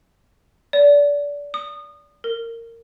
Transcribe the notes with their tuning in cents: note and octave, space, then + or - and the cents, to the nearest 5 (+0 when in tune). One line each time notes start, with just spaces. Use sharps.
D5 -25
D#6 -25
A#4 -20